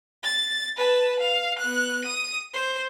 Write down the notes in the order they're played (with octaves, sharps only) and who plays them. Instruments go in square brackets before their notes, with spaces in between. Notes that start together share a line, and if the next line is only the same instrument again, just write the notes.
[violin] A6
B4 A5
F5
B3 F#6
D#6 D#7
C5